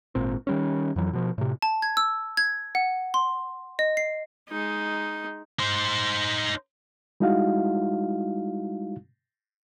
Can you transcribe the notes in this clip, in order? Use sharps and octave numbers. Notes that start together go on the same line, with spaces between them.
G#1 A#2 C4
D#3 G3 C#4
F2 E3 F#3
B2 F3
A2 C3
A5
G#6
E6
G#6
F#5
C6
D#5
C7
G#3 D#4
D#4 C5
G3 G#3 D#4 E4 F#4 F5